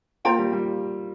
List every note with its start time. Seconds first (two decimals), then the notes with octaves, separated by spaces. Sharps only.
0.25 A#3 F4 C5 G5 A#5
0.38 G3
0.52 G3